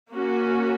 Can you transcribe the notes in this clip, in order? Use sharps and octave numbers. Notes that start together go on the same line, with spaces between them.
A#3 C#4 F#4